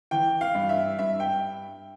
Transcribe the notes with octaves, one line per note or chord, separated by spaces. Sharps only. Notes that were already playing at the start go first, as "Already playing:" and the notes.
E3 G5
F5
G2
E5
G2 E5
G5